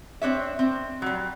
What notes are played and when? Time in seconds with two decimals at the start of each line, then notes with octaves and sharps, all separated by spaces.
0.21 C4 D4 C#5 E5
0.59 C4
1.02 F#3 G3